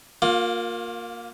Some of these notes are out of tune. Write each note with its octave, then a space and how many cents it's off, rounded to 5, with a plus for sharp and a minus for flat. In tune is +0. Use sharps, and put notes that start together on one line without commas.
A#3 +0 F4 +35